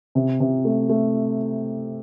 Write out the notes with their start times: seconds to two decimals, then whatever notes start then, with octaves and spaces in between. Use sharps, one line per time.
0.15 C3
0.40 C3
0.65 A3
0.89 A3